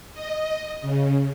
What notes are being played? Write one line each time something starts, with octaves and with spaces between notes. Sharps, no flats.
D#5
C#3